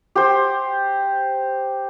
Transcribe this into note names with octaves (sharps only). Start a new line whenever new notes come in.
G4 C5